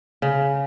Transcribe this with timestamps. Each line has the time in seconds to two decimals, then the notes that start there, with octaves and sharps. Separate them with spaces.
0.22 C#3